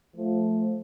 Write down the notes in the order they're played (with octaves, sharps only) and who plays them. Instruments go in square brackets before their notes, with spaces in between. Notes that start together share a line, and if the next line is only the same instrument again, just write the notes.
[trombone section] F3 A3